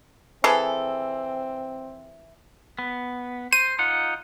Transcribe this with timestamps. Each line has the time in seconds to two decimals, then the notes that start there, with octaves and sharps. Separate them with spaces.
0.44 E3 C4 G#4 A4
2.79 B3
3.53 C5 D#7
3.79 D#4 F4 F#5